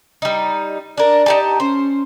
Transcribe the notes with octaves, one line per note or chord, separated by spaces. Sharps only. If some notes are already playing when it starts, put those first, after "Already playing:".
G3 D#4
D4 A#4 D5
D#4 G4 A5
C#4 C5